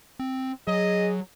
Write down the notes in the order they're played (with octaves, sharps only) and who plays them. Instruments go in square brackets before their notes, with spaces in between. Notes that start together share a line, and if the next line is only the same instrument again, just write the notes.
[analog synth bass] C4
[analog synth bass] F#3 [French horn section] G#4 [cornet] D#5